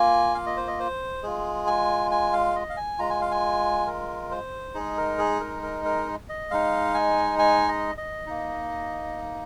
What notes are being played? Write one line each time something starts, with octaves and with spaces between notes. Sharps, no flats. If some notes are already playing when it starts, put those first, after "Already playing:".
Already playing: A#3 F4 G#5
F5
D#5
C5
D#5
C5
G#3 F4 G#4
G#5
G#5
F5
D#5
F5
G#5
G#3 F4 A#5
G#5
F5
G#5
A#4
C5
G#3 D#4 G#4
A#4
G#4
A#4
A#4
A#4
D#5
G#3 D#4 F5
G#5
G#5
D#5
D#5
A#3 D#4